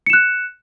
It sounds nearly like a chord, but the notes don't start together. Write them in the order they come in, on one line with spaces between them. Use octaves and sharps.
C#7 E7 F#6